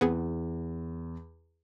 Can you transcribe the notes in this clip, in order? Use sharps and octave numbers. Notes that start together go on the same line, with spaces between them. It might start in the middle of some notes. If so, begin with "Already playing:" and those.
E2 B3 C4 G#4